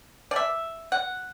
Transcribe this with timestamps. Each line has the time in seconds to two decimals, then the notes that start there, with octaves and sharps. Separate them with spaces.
0.31 D5
0.36 E5
0.92 F#5